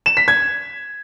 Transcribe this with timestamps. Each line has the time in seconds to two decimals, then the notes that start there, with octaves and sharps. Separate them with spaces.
0.06 E7
0.17 B6
0.28 G#6